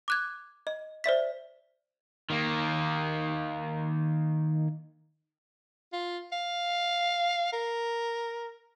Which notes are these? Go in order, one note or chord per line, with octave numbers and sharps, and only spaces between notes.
D6 F#6 G#6
D#5
C5 D5 E5 B6
D#3 A#3
F4
F5
A#4